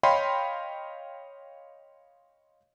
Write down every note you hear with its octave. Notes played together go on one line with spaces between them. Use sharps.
C#5 D#5 F5 G5 B5 C6